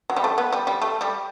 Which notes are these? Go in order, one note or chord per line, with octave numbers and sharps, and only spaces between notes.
F#3
G3
A3
B3
G3
G3
A3
G3